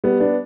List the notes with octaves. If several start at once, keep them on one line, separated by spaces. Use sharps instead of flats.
G3 B3
B3 D4